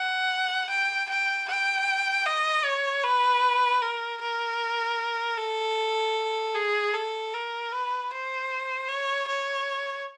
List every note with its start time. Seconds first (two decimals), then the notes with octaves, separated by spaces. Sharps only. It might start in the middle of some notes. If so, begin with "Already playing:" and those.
Already playing: F#5
0.70 G5
1.09 G5
1.48 G5
2.26 D#5
2.65 C#5
3.04 B4
3.82 A#4
4.22 A#4
5.37 A4
6.55 G#4
6.94 A4
7.33 A#4
7.72 B4
8.11 C5
8.88 C#5
9.28 C#5